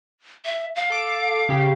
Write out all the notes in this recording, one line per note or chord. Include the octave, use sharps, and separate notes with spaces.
E5
F5
A4 D6 D7
C#3 G4